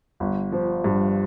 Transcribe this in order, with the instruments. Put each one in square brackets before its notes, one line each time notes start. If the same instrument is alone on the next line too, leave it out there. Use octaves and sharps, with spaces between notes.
[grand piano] G1
F3
G2